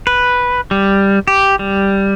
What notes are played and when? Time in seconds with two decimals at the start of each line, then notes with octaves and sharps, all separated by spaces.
0.07 B4
0.71 G3
1.28 G4
1.59 G3